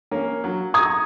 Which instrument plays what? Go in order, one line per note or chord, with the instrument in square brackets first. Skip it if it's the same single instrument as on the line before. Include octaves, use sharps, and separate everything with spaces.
[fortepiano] A#3 C#4
F#3
[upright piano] A#5 D#6 G#6 [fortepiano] C#6